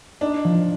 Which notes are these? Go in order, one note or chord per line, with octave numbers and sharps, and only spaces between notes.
D4 D#4
F3